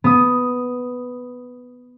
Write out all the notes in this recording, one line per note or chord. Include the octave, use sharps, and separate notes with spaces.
B3 D#6